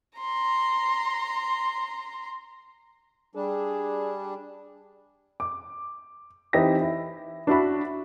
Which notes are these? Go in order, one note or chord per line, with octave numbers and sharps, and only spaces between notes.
A#5 C6
G3 D4 G#4
D6
E3 C4 D#4 G4 E5 A#6
E4
D4 E4 F#4 B5